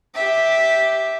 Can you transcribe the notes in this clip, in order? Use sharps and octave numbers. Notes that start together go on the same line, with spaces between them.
G4 E5